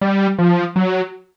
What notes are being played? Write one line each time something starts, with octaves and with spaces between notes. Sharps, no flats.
G3
F3
F#3